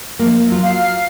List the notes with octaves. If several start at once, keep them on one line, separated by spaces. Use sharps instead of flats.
F3 A#3
F#3 F4
F5 C7